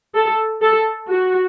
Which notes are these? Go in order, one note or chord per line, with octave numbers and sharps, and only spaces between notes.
A4
A4
F#4